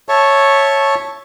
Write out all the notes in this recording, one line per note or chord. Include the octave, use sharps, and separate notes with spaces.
C#5 E5 A5 C#6